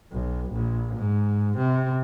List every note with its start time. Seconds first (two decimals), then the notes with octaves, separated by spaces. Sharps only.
0.11 B1
0.51 A#1
0.96 G#2
1.57 C3